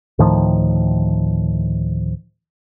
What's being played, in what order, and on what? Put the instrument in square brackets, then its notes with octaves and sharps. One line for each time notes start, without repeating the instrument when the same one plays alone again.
[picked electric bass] D2 A2 D#3 F3